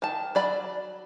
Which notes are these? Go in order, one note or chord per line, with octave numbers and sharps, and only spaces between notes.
D#3 A5
F#3 D5 B5